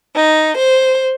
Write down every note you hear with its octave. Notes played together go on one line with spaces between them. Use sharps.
D#4
C5